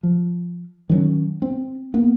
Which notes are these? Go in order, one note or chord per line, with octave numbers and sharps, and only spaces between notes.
F3
D#3 F#3 C#4
C4
A#3 B3